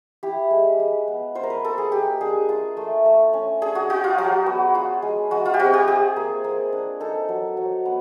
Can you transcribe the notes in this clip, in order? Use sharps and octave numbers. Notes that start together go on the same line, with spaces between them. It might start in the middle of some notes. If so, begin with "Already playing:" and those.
E4 G4
G#3
G#3
B3
F4 C5
A#4
B4
A#3 A4
G#4
A#3 G4
D4 G#4
F4
A3
A3
C#4
D4 G#4
F#4
F4 F#4
F4
F#3 F#4
B3
F4
G#3
G#3 F#4
F4
G4
C4 F#4
G4
F4 G#4
A#3
A#3
D4
D#4 A4
F#3
F#3
B3